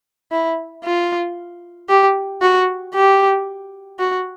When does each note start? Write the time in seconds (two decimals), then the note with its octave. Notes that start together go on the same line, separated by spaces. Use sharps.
0.32 E4
0.84 F4
1.89 G4
2.42 F#4
2.94 G4
3.99 F#4